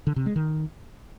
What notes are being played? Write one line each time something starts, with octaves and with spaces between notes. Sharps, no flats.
D3
C3
G#3
D#3